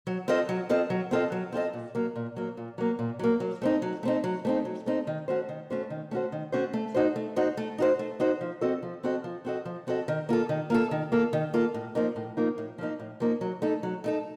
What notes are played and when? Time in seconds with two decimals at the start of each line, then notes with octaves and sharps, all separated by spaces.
0.07 F#3
0.28 C4 F4 A4 D#5
0.49 F#3
0.69 C4 F4 A4 D#5
0.90 F#3
1.11 C4 F4 A4 D#5
1.32 F#3
1.53 C4 F4 A4 D#5
1.73 A#2
1.95 F#3 A#3
2.16 A#2
2.36 F#3 A#3
2.57 A#2
2.78 F#3 A#3
2.99 A#2
3.19 F#3 A#3
3.40 F#3
3.62 A3 C4 D#4
3.82 F#3
4.03 A3 C4 D#4
4.24 F#3
4.45 A3 C4 D#4
4.65 F#3
4.86 A3 C4 D#4
5.07 D#3
5.28 A3 C#4 F#4 C5
5.49 D#3
5.70 A3 C#4 F#4 C5
5.90 D#3
6.11 A3 C#4 F#4 C5
6.32 D#3
6.52 A3 C#4 F#4 C5
6.73 A3
6.94 D#4 F#4 C5
7.16 A3
7.36 D#4 F#4 C5
7.57 A3
7.78 D#4 F#4 C5
7.99 A3
8.20 D#4 F#4 C5
8.41 F3
8.61 C4 F#4 A4 D#5
8.83 F3
9.03 C4 F#4 A4 D#5
9.24 F3
9.45 C4 F#4 A4 D#5
9.65 F3
9.87 C4 F#4 A4 D#5
10.08 D#3
10.29 A#3 F4 A4
10.49 D#3
10.70 A#3 F4 A4
10.91 D#3
11.12 A#3 F4 A4
11.33 D#3
11.54 A#3 F4 A4
11.74 A2
11.95 F3 A#3 D#4
12.16 A2
12.37 F3 A#3 D#4
12.58 A2
12.78 F3 A#3 D#4
13.00 A2
13.20 F3 A#3 D#4
13.41 F#3
13.62 A3 D#4 A4
13.83 F#3
14.04 A3 D#4 A4